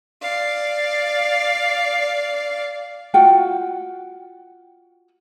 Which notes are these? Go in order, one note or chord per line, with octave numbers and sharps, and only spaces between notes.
D5 F5
F4 F#4 F#5 G5